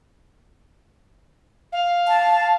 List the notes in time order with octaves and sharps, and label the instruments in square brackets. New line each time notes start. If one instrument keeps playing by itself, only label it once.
[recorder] F5
[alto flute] A5